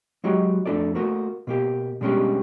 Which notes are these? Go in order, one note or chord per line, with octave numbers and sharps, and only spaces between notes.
F#3 G#3 D#4 F#4 G4
F2 A3 D4 E4 A4 D5
A3 A#3 F#4
B2 A#3 G4
B2 G3 G#3 C#4 D4 G4